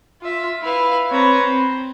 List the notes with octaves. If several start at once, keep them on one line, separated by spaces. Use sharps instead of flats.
F4 E5
E4 B4 F5
C4 B4 C#5 A#5
C4